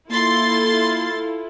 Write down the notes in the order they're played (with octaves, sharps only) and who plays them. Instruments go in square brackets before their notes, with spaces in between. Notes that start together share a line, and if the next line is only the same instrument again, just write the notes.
[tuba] A#3 [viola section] E4 F4 A4 [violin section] C6 A6